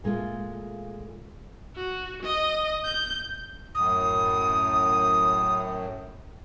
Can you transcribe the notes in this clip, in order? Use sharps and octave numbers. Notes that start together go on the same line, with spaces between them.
A#2 G#3 A3 F4
F#4
D#5
G6
F#2 A2 D#6